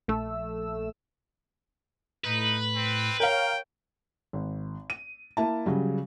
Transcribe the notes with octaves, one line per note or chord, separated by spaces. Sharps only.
A#1 A3 E6
A2 D#4 B4
C4
A#4 C#5 F5 G5
G#1
D#7
A#3 E4 A5
C#3 F#3 G3